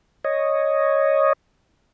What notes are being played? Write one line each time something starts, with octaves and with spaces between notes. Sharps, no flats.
C#5 D#5